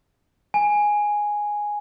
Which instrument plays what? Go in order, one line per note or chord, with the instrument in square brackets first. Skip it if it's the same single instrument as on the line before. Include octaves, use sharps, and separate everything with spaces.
[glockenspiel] G#5